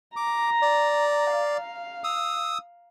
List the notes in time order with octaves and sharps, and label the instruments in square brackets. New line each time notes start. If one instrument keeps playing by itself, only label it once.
[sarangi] A#5 [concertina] D6
[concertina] D5
[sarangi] F5
[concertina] D#6 E6